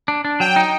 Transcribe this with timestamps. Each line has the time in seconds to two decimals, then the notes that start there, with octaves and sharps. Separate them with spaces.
0.08 D4
0.25 D4
0.40 F#3 G5
0.56 D#4